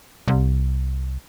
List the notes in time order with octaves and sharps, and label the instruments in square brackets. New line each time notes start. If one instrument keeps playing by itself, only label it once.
[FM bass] C2